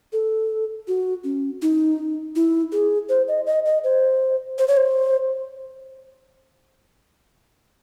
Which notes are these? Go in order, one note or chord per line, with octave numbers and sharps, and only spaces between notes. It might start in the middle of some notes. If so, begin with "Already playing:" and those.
A4
F#4
C#4
D#4
E4
G#4
C5
D#5
D#5
D#5
C5
C5
C#5
C5